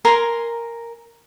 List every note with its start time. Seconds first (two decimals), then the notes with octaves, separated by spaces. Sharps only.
0.05 A#4 G#5 A#5 C6